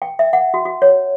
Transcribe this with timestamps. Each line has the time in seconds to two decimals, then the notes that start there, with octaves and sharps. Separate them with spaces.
0.02 G5
0.19 E5
0.33 F#5
0.54 F#4
0.65 F#4
0.82 C#5